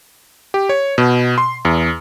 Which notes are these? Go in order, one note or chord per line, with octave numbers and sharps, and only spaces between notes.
G4
C#5
B2
C6
E2